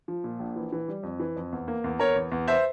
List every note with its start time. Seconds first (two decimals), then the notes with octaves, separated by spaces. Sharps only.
0.08 F3
0.24 A#2
0.39 A#1
0.56 E3
0.72 E3
0.88 G3
1.03 F2
1.20 E3
1.36 F2
1.53 E2
1.68 A#3
1.84 E2
1.99 E2 A#4 C#5
2.16 E2
2.32 E2
2.48 C5 E5